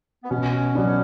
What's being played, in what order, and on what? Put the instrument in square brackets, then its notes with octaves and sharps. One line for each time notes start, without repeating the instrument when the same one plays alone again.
[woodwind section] B3
[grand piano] B2 [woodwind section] C#4
[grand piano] F#3 B3 D4